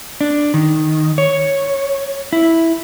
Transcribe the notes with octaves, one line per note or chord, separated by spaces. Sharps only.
D4
D#3
C#5
E4